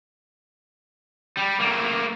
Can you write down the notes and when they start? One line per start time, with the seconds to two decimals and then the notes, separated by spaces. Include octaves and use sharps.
1.37 G3
1.60 A3 A#3